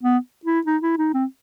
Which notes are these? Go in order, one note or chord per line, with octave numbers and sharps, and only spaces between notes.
B3
E4
D#4
E4
D#4
C4